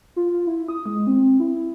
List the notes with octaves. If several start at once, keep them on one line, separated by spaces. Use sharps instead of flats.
F4
F4
E4
D#6
G#3
C4
E4